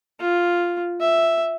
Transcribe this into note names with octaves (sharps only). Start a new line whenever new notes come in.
F4
E5